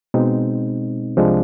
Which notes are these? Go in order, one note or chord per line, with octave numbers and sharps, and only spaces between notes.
B2 G#3 C4 D#4
C2 C3 F3 G#3 D4